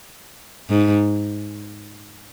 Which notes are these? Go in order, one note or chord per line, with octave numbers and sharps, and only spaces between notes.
G#2